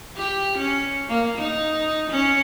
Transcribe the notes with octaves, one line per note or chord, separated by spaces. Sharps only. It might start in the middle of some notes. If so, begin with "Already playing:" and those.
G4
C#4
A#3
D#4
C#4